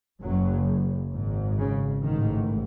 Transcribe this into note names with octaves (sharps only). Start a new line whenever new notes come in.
F#1 F#2 C#3 F#3
G#1 G#2
C#3
A1 G#2 D#3